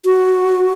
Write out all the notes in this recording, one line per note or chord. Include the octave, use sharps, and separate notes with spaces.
F#4